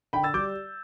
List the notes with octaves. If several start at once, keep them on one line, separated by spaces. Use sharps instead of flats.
D3 G5 B5
E6 A6
G3 D6 G6